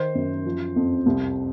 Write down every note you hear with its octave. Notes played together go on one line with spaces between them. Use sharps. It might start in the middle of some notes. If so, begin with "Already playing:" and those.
Already playing: D#3 C5
F#2
F3
F2
C2